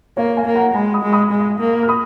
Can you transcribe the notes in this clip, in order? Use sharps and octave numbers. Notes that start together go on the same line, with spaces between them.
A#3 C#5 F5
F5 G#5
A#3
F#5 A#5
G#3 G#5 B5
B5 D#6
G#3
B5 D#6
G#3
A#3
F6
B5 D#6